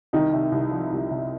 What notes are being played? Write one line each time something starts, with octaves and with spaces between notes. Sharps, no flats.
C2 D#3 D#4
C3
C2
F3
C2
C3